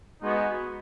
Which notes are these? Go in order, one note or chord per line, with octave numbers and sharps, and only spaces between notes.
G#3 B3 D#4 F#4